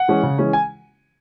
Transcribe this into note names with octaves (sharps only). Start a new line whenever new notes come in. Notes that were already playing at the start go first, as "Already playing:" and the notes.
Already playing: F#5
E3 G#3 C#4
C#3
E3 G#3 C#4
G#5